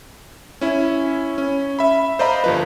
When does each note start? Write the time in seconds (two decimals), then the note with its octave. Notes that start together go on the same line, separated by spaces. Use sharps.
0.61 C#4 E4
1.38 C#4
1.79 E5 B5
2.19 C5 D5 D#5 F5 A#5 B5
2.44 G1 F3 B4